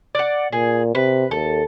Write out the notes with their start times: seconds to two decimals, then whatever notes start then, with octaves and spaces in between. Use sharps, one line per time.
0.15 D5 F#5
0.53 A#2 G#4
0.95 C3 B4
1.31 D#2 A4